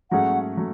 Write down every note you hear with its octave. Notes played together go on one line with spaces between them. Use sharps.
G#2 F#3 A3 C#4 G#4 F#5
F#3 A3